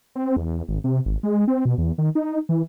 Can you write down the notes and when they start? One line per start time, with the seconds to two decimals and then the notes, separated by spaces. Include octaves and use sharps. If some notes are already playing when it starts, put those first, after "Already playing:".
0.15 C4
0.37 E2
0.68 G#1
0.84 C3
1.06 G#1
1.23 G#3
1.48 C4
1.65 B2
1.78 E2
1.98 D#3
2.15 D#4
2.49 E3